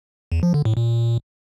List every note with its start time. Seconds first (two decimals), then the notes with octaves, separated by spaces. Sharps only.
0.32 E2
0.43 F3
0.54 D3
0.65 A2
0.77 A#2